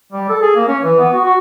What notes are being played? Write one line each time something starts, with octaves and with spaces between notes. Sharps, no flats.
G3
A4
G#4
A#3
C#4
E3
B3
F#4
F#4